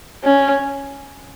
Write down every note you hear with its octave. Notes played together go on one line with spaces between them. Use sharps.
C#4